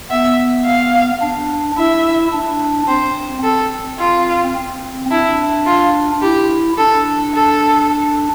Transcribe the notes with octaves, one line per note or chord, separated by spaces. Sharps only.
B3 E5
F5
D4
E4 E5
D4
C4 C5
C4 A4
F4
C4
D4 E4
F4
E4 G4
D4 A4
A4